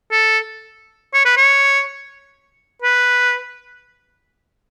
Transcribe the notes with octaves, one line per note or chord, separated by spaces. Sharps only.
A4
C#5
B4
C#5
B4